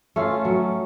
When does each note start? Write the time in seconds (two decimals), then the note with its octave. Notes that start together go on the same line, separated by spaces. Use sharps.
0.16 A3 C#4 F4
0.45 F#3